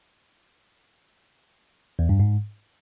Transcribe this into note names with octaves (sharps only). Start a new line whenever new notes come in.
E2
G2
G#2